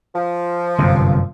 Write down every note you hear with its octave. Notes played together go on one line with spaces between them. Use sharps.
F3
G1 F#2 C3